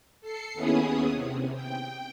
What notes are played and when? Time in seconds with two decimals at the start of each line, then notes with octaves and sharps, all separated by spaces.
0.21 A4 C7 C#7
0.54 D#2 B3 C#4 E4 G#4 D#6
1.12 C3
1.54 G5